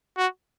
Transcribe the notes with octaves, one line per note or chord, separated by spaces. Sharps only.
F#4